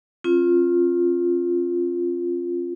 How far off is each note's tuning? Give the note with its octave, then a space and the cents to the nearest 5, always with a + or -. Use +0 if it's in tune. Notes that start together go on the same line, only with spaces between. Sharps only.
C4 +45 F4 +0